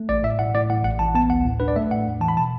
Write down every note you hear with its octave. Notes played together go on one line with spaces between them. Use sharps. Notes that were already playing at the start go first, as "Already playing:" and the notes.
Already playing: A3
A1 D5
A2 E5
A2 F#5
A2 D5
A2 F#5
A1 F#5
A1 A5
B3 A5
D2 F#5
A2
D4 B4
D5
A3 E5
A2 F#5
E2
E3 A5
B5
B2 A5